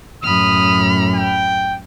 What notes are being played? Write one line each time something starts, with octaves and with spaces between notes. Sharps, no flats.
F#2 A2 B5 D#6 F6
G5